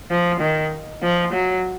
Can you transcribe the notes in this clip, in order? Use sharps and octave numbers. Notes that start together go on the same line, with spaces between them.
F3
D#3
F3
F#3